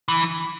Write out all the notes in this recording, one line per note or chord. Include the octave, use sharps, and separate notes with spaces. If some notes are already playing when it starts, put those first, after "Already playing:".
E3